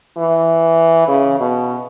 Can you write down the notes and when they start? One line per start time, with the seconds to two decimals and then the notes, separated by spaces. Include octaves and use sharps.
0.18 E3
1.08 C#3
1.40 B2